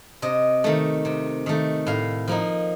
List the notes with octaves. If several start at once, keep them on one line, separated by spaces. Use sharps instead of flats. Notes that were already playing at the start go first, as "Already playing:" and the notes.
C3 D#5
D#3 A3
C3
D#3 A3
A2 F5
F3 A#3 D#4